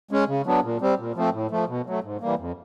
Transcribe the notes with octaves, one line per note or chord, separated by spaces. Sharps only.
G#3 C#4
C#3
F#3 B3 D4
A#2
G3 C4
A#2
F3 A3 C4
A2
F3 A3
B2
F#3 A3
G#2
E3 G3 A#3
F2